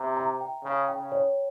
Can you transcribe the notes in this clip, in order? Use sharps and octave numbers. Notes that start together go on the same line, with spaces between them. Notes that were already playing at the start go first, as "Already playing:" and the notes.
Already playing: C3 E5 A#5
A#5
G5
C#3 C#5
G5
C#3
C#5